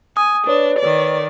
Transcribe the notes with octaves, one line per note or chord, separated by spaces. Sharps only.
G#5 D#6
D4 B4 C#5
D#3 D5